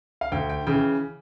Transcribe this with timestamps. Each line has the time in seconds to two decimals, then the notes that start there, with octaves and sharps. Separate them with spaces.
0.21 F5
0.32 D2 G5
0.50 G5
0.67 C#3 E3 G5